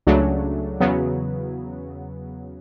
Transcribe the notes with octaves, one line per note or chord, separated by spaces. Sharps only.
C#2 C#3 F#3 A3 D4
E2 C#3 F#3 B3